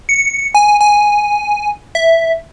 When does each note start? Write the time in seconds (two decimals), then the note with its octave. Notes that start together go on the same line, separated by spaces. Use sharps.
0.09 C#7
0.55 G#5
0.81 G#5
1.95 E5